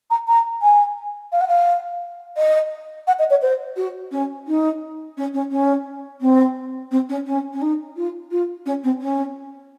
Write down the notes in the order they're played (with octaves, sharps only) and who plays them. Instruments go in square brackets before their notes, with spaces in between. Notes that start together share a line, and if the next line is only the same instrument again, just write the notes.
[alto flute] A#5
A#5
G#5
F5
F#5
F5
D#5
F#5
D#5
C#5
C5
F#4
C#4
D#4
C#4
C#4
C#4
C4
C4
C#4
C#4
C#4
D#4
F4
F4
C#4
C4
C#4